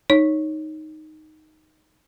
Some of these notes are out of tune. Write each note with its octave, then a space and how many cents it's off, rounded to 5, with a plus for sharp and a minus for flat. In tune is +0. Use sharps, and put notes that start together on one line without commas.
D#4 +0 C#5 +0